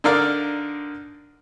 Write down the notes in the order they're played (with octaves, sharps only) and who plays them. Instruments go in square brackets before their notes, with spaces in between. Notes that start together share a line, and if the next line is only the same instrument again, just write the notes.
[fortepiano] D3 D#4 A#4 D5 F5 F6